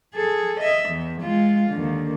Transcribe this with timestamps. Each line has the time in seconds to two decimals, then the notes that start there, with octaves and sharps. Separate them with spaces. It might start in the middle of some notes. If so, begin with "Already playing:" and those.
0.15 G#4 A4
0.60 D#5 E5
0.90 E2
1.22 G#3 F4
1.70 D#2 D3